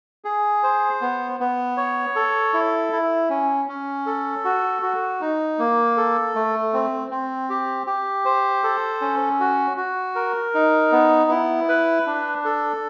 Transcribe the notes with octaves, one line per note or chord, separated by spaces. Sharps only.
G#4
C5
B3
B3
C#5
A4
E4
E4
C#4
C#4
A4
F#4
F#4
D#4
A#3
A4
A3
C4
C4
G4
G4
C5
A4
C#4
F#4
F#4
A#4
D#4
B3
E4
B4
D4
A4